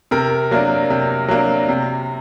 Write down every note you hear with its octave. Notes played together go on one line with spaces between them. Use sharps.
C3 A#4
F#3 A#3 D4
C3
F#3 A#3 D4
C3